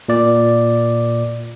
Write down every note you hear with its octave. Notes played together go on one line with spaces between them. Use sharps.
A#2 D5